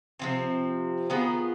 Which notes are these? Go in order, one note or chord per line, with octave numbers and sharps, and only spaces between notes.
C3 F3 C4
D#3 B3 F4 G#4